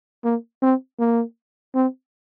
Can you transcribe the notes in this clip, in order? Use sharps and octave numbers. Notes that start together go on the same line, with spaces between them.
A#3
C4
A#3
C4